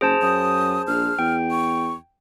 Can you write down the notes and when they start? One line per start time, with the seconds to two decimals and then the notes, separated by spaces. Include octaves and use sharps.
0.01 F#1 G#4 C5 A5
0.22 F#2 D#6
0.87 A#1 F6
1.19 E2 G5
1.51 C#6